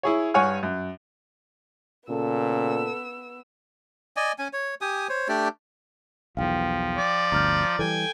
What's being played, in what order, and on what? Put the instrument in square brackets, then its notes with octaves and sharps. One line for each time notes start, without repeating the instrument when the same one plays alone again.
[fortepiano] E4 G#4 C#5
G2 C#5 F#5 G#5 F6
F#2
[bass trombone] A#2 [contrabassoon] C#3 [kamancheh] B3 E6 [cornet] A4
[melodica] D5 D#5 G#5
C#4 G#5
C#5
G4 G#5 D#6
C5 C#5
A3 D4 G4 D5
[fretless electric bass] B1 E2 [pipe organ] F3 [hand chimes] F5 G5
[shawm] D5
[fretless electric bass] G1 D2 [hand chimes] A#5 F6 G6
[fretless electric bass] E3 F3 G3 [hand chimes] A4 [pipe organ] G5 G#5 G#6